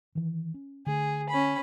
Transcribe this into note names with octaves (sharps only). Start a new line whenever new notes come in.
D#3 E3
C#4
D3 A3 G#4
C#4 B5